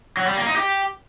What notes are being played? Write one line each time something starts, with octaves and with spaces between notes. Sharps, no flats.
F#3
G3
A#3
D#4
G4